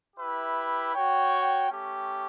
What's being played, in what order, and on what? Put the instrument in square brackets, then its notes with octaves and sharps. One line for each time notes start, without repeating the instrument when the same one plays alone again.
[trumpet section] E4 G4 B4 E5
F#4 C#5 G5
A3 C#4 G4